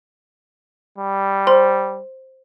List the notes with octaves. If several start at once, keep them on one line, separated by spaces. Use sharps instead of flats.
G3
C5 C6